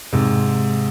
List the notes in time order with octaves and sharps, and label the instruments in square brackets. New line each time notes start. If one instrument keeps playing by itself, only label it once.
[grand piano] G#2 C3